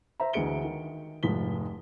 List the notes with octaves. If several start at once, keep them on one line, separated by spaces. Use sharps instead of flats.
C5 E5 A#5
D2 E3 G#3 C#7 D7 G7
D#3
F1 G#2 F3 B6 G7